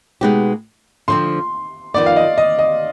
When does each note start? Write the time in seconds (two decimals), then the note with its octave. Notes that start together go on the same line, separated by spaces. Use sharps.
0.21 B2 G#3 B3 D#4 G4
1.08 D3 F3 C4 C6
1.94 F2 D#3 B3 D5
2.06 F5
2.16 D#5
2.38 D#5
2.59 D#5